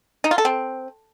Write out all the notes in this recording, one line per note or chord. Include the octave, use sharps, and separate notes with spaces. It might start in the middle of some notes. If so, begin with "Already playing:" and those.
D#4
F4
A4
C4